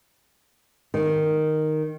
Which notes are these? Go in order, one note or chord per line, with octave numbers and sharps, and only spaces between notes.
D#3